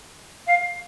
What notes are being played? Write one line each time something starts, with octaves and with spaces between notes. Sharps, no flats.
F5